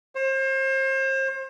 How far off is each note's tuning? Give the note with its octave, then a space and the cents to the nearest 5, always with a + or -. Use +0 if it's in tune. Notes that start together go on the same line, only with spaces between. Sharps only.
C5 +35